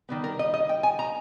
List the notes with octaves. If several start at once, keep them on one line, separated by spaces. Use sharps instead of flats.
D#3 G3 B3
A#4
D#5
D#5
G5
G#5
A#5